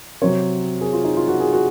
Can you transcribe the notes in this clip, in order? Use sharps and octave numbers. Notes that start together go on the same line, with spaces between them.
C3 F#3 C4 C#5
G#4
F4
D#4
F4
F#4
G#4
F#4